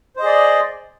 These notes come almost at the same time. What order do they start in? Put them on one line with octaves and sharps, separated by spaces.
C5 D#5 G#4 D5